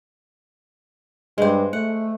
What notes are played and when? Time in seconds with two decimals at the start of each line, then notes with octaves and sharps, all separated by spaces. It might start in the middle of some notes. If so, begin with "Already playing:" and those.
1.38 G2 G#3 C5
1.73 A3 F#5